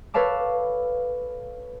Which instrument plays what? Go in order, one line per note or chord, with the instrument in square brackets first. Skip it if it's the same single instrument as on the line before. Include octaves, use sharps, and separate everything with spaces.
[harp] A4 B4 C#5 F5 A5 D6